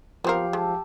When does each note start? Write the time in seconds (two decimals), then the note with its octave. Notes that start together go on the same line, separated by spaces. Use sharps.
0.24 F3 B3 C4 G4 A#4 F5
0.53 G#3 E5 A5